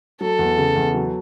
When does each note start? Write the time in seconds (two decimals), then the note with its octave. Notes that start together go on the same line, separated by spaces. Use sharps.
0.21 F#3 A4
0.39 E2
0.58 C#3
0.76 E2
0.94 F#3